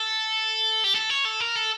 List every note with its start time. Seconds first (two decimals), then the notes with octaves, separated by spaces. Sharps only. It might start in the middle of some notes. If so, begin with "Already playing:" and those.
Already playing: A4
0.84 G4
0.95 A4
1.10 C#5
1.25 A4
1.41 A#4
1.56 A4